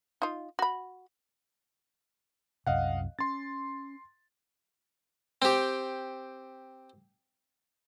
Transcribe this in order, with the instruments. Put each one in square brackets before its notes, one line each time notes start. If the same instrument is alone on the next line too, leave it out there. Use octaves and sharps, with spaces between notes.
[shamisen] D#4 F4
F#4 B5
[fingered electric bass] C2 F#2 C3 [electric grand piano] D#5 F5 F#5
[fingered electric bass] C#4 [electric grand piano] C6 A6
[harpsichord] C4 G4